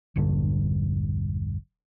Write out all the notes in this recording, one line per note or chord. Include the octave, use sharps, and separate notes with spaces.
E1 A#1 G2 D3